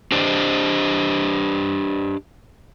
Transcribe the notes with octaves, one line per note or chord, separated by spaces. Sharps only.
D4 G4 C5 D5 D#5